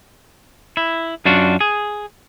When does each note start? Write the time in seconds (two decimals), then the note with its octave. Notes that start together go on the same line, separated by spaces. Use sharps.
0.77 E4
1.25 F#2 D4 F4 F#4
1.61 G#4